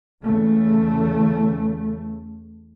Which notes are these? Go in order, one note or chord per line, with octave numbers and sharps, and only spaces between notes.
E2 C#3 A3